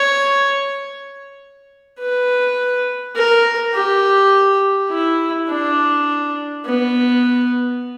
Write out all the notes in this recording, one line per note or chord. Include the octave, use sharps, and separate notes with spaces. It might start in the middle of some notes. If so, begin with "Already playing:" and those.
Already playing: C#5
B4
A#4
G4
E4
D4
B3